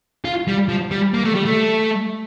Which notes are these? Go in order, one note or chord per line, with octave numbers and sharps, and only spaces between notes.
F4
G3
F3
G3
A#3
A3
G3
A3